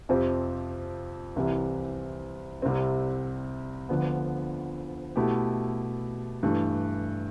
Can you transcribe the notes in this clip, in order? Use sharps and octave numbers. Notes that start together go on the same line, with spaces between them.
F2 C3 F3 C4 G4
C2 C3 E3
C2 C3 G3 C4
D2 D3 F3 B3
B2 A3 E4 G4
G2 E3 A3